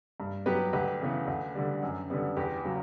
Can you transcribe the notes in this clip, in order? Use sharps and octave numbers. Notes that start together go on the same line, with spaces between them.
G2
F#3 B3 G4 B4
D2 G4 B4
C#3 E3 B3
D2
D3 G3
F#2
D3 G3 B3
E2 G4 B4
C#3 F#3